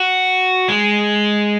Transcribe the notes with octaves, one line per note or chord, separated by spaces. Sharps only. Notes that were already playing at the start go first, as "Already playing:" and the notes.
Already playing: F#4
G#3